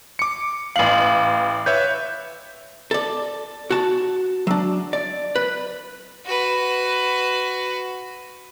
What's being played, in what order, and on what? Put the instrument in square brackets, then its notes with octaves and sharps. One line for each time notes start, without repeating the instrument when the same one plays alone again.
[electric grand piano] D6 C#7
[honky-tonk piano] A1 F#7 [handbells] F5
[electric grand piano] B4 C#5 E5 [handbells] G6
[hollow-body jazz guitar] A4 D5
F#4 A5
F#3 D4
D5
B4
[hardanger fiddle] F#4 B4